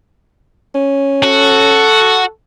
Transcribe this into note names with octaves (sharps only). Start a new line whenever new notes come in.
C#4
F#4 A4